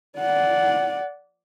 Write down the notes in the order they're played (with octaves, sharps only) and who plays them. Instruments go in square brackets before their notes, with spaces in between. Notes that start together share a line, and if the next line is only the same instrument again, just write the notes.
[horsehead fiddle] D5 F#5